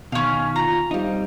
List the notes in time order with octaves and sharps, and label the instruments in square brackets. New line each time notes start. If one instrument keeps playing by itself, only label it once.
[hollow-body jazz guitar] B2 D#3 [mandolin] C#4 F5
[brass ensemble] F4 [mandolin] A#5
[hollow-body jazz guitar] G3 D#4 [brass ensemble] C4 F5